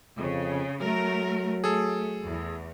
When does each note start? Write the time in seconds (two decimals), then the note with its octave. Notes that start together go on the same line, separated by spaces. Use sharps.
0.18 F2 C#3
0.81 F#3 A3 A#4
1.64 A3 G#4 A4
2.25 E2